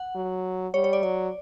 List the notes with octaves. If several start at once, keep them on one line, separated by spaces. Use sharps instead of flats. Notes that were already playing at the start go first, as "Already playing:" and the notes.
Already playing: F#5
F#3
G3 C#5
C#5
D5
F#3 D5